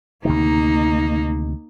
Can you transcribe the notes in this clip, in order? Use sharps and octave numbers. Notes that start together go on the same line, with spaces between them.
D2 C3 D#3 A#3 D#4